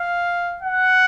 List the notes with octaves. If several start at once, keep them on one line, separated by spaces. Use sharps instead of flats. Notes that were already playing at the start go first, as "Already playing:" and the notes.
Already playing: F5
F#5